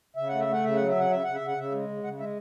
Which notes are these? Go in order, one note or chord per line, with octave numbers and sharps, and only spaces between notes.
C#3 E5
A3 F#5
E5
A3
F#5
C#3 E5
F#3 F#5
E5
C#3 F#5
C#3 E5
C#3 F#5
E5
C#3
F#5
C#3 E5
G#3
C#3
C#3 F#5
G#3 E5